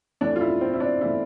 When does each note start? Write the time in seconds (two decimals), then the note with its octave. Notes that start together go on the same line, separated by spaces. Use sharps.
0.21 F2 E3 A3 D4
0.36 F4
0.41 E4
0.61 C4
0.73 E4
0.80 D4
1.01 E3 A3 E4